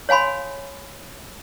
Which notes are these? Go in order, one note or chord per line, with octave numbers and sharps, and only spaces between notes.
C#5 F5 G#5 B5 C6